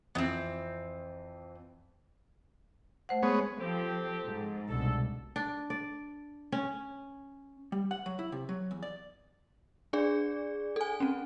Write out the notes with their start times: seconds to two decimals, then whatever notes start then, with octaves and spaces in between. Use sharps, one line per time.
0.15 F2 E3 B3 C4
3.09 A3 C5 F#5
3.23 G#3 B3 C#5
3.59 F3 C4 G4 A4
4.25 G#2
4.69 C2 B2 D3 A4
5.36 D4
5.70 D5
6.52 C#4
7.72 G3
7.91 F#5
8.06 F#3
8.19 E4
8.32 C3
8.49 F#3
8.71 E2
8.83 D5
9.93 D4 G#4 D5
10.76 A4 G#5
11.00 C4 C#4